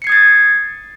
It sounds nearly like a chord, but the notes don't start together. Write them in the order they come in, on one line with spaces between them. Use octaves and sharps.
C#7 C7 G#6 D#6 A6